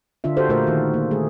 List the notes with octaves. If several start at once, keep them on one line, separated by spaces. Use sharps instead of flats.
D3 D4 F4 E5
F#4 G4 A4 C5
A#2 A3 F4 A#4 C5
D#3 F#4
A#3
A3 G#4